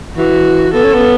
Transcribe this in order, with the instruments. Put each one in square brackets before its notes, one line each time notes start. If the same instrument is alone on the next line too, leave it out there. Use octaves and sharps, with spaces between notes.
[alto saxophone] E3 [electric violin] F#4
[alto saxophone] B3 [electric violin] A4
[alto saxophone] C#4
B3